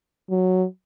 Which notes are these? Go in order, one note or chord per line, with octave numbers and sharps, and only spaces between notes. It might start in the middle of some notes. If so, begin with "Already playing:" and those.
F#3